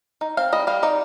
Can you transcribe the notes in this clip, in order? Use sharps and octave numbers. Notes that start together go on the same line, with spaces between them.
D#4
C4 F5
G3 D#5
G3 F5
D#4 D5